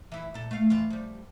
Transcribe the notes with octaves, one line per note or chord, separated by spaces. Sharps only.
E3 E4
A#2 A4
A3 F5
F2 E3 F4
F3 G3